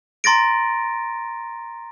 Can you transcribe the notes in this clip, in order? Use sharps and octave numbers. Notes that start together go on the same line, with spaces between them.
A#5 C6 A6 A#6 D7